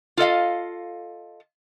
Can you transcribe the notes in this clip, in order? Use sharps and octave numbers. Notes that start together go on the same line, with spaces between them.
F4 A4 D#5 F5